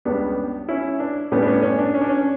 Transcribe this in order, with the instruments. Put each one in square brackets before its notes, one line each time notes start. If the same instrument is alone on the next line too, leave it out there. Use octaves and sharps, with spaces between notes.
[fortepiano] C#2 C#3 G3 B3 D4
C#4 E4
D4
A2 G3 B3 C#4
D4
C#4
C#4
D4
C#4
D4
C#4